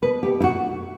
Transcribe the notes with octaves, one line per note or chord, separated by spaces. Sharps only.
B2 B4
A3 G4
E4
A3 F#4